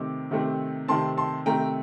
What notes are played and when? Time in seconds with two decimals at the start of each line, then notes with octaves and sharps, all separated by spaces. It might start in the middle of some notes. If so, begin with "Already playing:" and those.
Already playing: C3 D#3 A3 C4 D6
0.31 C3 D#3 A3 C4
0.88 C3 D#3 A3 C4 A5 C6
1.17 A5 C6
1.46 C3 D#3 A3 C4 G5 A#5